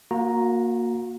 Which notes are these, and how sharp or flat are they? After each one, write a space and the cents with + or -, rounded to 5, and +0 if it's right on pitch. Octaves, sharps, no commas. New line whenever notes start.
A#3 +0 F#4 -35 A#5 +0